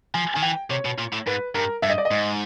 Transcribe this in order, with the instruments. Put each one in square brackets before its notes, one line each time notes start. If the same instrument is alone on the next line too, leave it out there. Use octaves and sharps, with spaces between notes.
[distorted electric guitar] F3 [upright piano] G#5
[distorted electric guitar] D#3 [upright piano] G#5
[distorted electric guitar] E3 [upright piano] G5
[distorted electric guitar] C3 [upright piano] C#5
[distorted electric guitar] B2
A#2
A2
[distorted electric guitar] G#2 [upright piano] B4
[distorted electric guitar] G2 [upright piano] A#4
[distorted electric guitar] G2 [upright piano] E5
[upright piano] D#5
D5
D#5
[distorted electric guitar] G#2